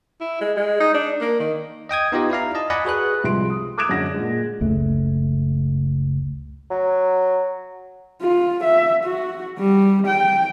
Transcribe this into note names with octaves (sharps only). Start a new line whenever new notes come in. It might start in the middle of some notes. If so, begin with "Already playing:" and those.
E4
G#3
G#3
D#4
D4
A#3
D#3
D#5 G5 D#6 G#6
B3 D#4 F4 G4 D#5
E4 D5 F5 A#5
D#5 A5
D5 D#5 F#5 G#5 B5
F#4 G#4 B4 F#6
C2 F3 G#3 C6 D7
D#6
D6 D#6 F#6 G#6 D7 E7
F#2 D3 G#3 D4 F#5 A#6
A#2 G#3
F#1 C#2 A3
F#3
F4
E5
F#4
G3
G5